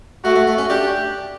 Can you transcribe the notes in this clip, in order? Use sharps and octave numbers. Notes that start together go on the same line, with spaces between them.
A3 F#4
A3
A3
C#4
D4 G4